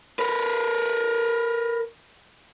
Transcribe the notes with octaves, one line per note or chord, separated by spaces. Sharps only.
A#4 B4